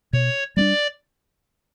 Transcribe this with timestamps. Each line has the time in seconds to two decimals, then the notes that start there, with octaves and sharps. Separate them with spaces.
0.13 B2 C#5
0.57 G3 B3 D4 D5